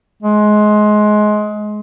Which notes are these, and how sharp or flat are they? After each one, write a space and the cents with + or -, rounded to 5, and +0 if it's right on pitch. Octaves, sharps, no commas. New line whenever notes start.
G#3 +20